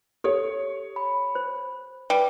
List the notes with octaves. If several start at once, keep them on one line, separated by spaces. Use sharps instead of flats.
G4 A4 C#5
B5
C5
G3 B4